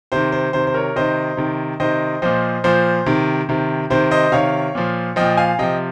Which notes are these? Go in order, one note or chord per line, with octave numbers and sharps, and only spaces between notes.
C3 D#3 C5
C5
C3 D#3 C5
C5
A#4 C#5
C3 D#3 C5 D#5
C3 D#3
C3 D#3 C5 D#5
A#2 F3 C5 D#5
A#2 F3 C5
C3 D#3
C3 D#3
C3 D#3 C5
C5 D#5
C3 D#3 C#5 F5
A#2 F3
A#2 F3 D#5 G5
F5 G#5
C3 F3 D#5 G5